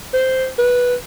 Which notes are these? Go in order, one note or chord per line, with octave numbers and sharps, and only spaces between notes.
C5
B4